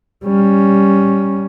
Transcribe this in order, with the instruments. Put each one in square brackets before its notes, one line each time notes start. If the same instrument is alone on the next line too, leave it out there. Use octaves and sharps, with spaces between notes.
[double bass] G3 C#4